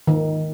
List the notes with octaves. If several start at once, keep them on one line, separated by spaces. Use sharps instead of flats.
D#3